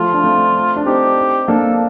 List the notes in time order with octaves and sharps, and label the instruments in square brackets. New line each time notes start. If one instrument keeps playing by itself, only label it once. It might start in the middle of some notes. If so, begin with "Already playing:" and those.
Already playing: [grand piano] F3 A3 [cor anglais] F4
[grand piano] D4
A3 C4
D4
[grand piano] C4 D#4 [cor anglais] G4
[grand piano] A#3 D4 [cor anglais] A4